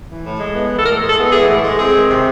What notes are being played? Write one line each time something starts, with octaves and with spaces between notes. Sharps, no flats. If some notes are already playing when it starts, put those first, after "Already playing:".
E3
A2
G#3
B3
E3
A4
A2 A#4
G#3
A4
B3
E3 G#4
A2
G#3
C4 G#4
D#3
C3